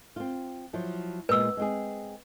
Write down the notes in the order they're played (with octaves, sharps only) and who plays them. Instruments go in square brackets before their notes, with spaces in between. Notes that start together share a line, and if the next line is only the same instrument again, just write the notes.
[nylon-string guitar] C4 F4
F3 F#3 E4
[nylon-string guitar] A#2 G#3 B3 [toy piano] B4 E6
[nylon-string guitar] G#3 C4 G#4